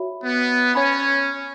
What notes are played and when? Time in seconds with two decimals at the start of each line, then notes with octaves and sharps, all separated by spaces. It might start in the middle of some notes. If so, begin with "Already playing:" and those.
Already playing: F#4 C#5 E5 B5
0.23 B3
0.75 C#4 C#5 G#5 B5